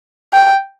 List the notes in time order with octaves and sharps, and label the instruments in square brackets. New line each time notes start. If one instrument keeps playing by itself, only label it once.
[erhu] G5